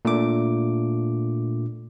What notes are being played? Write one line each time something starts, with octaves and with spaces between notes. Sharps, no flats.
A#2 A3 D4 D6